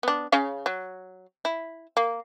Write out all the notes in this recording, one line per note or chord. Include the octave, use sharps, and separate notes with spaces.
B3 D4
C#3 C#4 F5
F#3
E4
A#3